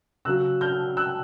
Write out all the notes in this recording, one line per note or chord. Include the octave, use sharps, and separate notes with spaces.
C#3 F#3 E6 F#6
F6 G6
E6 F#6